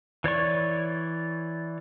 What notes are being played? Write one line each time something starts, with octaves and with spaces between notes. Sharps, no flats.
E3 C#5 D5 C#6